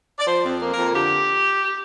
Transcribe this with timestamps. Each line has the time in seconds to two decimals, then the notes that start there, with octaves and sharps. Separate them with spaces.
0.19 D5
0.27 F3 C5
0.44 F2
0.60 A#3
0.71 A#4
0.76 F2
0.93 D3 G4